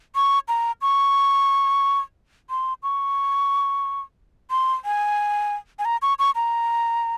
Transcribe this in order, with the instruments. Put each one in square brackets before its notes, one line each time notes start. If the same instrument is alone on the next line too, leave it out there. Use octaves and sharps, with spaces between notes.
[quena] C#6
A#5
C#6
C6
C#6
C6
G#5
G#5
A#5
C#6
C#6
A#5